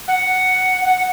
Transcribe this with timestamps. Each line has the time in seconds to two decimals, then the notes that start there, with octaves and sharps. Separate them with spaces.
0.08 F#5
0.85 F#5